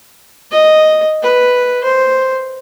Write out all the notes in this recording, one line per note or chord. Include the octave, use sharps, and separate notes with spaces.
D#5
B4
C5